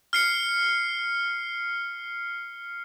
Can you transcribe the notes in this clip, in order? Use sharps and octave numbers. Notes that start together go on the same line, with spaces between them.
F6 C7 C#7